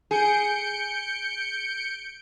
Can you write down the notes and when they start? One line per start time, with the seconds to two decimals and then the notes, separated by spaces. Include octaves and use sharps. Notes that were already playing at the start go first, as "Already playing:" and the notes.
0.11 G#4 G6 C#7 D7